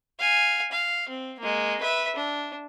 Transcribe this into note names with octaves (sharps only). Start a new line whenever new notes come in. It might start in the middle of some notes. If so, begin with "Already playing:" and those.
F5 G#5
F5
C4
G#3 A#3
B4 E5
D4